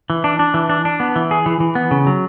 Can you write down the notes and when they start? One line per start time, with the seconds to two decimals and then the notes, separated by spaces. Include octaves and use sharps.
0.10 E3
0.24 D4
0.39 D4
0.54 E3
0.70 D4
0.85 D4
1.00 B3
1.16 E3
1.31 G#4
1.46 E3
1.60 E3
1.75 B3
1.91 C#3
2.07 F#3